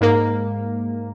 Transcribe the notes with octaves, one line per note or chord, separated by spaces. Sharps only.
G#2 A#3